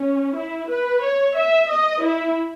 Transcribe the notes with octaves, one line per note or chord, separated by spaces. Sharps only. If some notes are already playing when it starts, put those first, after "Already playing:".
Already playing: C#4
E4
B4
C#5
E5
D#5
E4